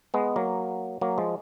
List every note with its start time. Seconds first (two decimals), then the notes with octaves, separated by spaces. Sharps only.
0.14 G#3 B3
0.36 F#3 A#3
1.01 F#3 A#3
1.18 F3 G#3